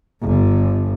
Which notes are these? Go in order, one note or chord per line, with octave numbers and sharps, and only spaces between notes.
G1 D3